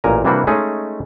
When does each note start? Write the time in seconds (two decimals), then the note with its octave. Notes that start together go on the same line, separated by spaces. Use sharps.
0.04 A1 A#2 A#4 G#5 A#5
0.25 C3 E3 G3 A#3 D4 F#4
0.47 G#3 A3 C#4 D#4 G#4